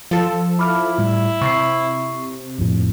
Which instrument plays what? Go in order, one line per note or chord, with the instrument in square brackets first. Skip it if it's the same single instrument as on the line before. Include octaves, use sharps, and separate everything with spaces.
[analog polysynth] F3 A4
[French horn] E4 [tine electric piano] B5 D6 F6
[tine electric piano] A2 G3
[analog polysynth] C3 [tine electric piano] C#6 C7
[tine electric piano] A#1 F2 A2